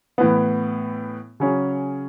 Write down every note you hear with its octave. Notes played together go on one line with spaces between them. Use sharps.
A2 E3 B3
C#3 F#3 C#4 G#4 C#5